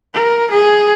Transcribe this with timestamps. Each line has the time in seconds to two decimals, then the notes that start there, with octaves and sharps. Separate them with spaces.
0.14 A#4
0.51 G#4